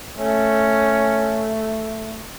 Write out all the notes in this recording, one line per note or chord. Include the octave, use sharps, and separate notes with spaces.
A3 C#4